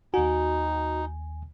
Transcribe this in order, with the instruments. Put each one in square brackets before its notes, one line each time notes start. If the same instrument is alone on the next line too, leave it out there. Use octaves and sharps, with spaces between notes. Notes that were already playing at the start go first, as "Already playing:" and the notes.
[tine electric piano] D#2 G#5 [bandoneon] D#4 [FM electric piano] F#4